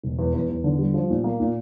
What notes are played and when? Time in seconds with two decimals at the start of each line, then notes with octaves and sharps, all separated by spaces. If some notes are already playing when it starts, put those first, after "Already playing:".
0.03 E1
0.19 E2
0.34 E2
0.50 E2
0.64 D3
0.79 G3
0.94 F3
1.10 A#2
1.24 A#3
1.40 A#2